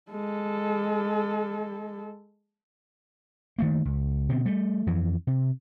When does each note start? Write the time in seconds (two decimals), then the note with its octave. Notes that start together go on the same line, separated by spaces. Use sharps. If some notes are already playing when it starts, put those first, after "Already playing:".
0.11 G#3 A4
3.59 D#3 A3 A#3
3.85 C#2
4.29 B2 D3 C4
4.45 G3 A3
4.87 F2 E3
5.27 C3